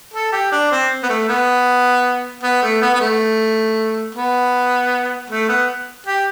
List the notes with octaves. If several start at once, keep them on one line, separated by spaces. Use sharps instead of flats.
A4
G4
D4
C4
B3
A3
B3
B3
A3
B3
B3
A3
B3
A3
B3
G4